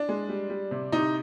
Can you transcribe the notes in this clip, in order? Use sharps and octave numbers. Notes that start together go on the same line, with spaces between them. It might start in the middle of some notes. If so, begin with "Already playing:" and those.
Already playing: D4
G#3
G3
G3
C3
C3 D#4